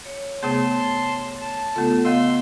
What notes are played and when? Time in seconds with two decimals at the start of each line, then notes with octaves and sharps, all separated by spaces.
0.05 C#5
0.43 C3 A3 B3 G#4 A5 C6
1.41 A5
1.76 C#3 A3 B3 F4 A4
2.05 B3 D#5 F5 C6 E6